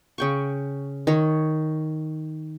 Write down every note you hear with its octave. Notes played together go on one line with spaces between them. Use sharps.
C#3 G5 C#6
D#3 C#5